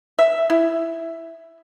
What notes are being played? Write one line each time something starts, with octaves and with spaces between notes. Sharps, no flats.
E5
E4